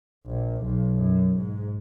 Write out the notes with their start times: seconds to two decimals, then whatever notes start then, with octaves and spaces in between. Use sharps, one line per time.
0.26 A#1
0.63 B1
0.96 F#2
1.36 G#2